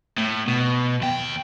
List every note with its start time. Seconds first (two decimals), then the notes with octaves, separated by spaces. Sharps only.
0.18 A2
0.48 B2
1.02 D#2 G5